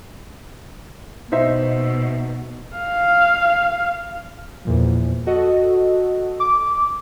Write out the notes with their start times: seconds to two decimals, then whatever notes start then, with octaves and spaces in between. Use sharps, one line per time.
1.32 B2 D#4 C5 E5
2.77 F5
4.65 E2 A#2 F3
5.26 F#4 A4 D#5
6.40 D6